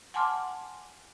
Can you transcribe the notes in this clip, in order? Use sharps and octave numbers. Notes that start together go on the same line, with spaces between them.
F#5 G#5 A5 C6 D6 F6